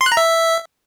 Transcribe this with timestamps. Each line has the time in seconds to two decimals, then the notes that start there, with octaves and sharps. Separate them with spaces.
0.01 C6
0.06 F#6
0.12 A#5
0.17 E5